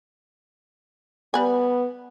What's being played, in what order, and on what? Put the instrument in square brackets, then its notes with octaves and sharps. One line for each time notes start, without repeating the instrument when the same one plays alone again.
[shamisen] G3 B4 G#5 [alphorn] B3